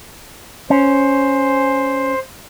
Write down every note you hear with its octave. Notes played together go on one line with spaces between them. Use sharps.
C#4 C5